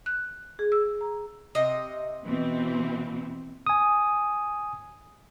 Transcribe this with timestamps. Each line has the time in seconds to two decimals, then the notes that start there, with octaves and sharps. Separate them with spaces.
0.06 F#6
0.59 G#4
0.72 E6
1.01 A#5
1.55 C3 D#5
2.25 B2 E3 C4
3.67 G#5 D#6